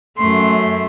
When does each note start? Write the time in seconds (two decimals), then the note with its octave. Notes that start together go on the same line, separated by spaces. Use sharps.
0.18 F#2 A3 C6